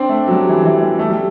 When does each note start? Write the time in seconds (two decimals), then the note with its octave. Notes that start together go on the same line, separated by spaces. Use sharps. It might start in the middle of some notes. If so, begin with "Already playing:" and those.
Already playing: C4 D4
0.09 A3
0.27 F#3
0.31 G3
0.49 E3
0.65 E3
0.83 G3
0.99 A3
1.10 G3